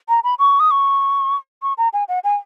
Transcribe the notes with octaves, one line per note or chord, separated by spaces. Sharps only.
A#5
B5
C#6
D#6
C#6
C#6
A#5
G#5
F#5
G#5